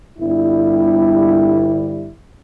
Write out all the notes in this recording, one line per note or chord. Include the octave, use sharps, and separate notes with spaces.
G1 G3 E4